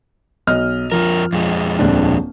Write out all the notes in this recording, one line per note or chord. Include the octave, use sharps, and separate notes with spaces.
B1 D#5 F6
F2 F3 A#4
F2 G#3
D#1 C4 D4